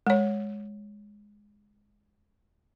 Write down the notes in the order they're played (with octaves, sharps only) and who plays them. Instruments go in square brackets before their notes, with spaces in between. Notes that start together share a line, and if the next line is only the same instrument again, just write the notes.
[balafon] G#3 C#5